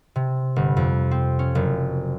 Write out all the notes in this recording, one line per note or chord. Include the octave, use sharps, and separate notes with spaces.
C3
G1
F2
C4
C#4
F#1